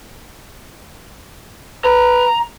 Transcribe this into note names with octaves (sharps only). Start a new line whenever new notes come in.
B4 A#5